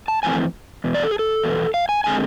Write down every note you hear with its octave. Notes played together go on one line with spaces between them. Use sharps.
A5
F2 C3 E3 A3 C4 G#5
E2 B2
D5
A4
G#4
A4
E2 B2 B3
F5
G#5
D3 G#3 C4 G#5